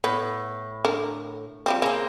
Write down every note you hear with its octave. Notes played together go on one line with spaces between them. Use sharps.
A2 B3
D3 A#4
F3 G3 C4
C#3 A#3 C4